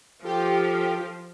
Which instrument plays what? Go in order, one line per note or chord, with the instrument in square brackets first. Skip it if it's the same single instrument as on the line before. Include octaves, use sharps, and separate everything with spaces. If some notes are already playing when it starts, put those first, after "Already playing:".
[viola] F3 [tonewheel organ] F4 A4 [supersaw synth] G4